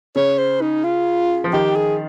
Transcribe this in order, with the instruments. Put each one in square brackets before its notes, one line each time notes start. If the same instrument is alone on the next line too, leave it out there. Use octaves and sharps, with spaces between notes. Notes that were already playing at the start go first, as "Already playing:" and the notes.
[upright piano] C#3 [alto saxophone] C#5
[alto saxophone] C5
D#4
F4
[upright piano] F3
[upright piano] D#3 [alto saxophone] G4
[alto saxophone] G#4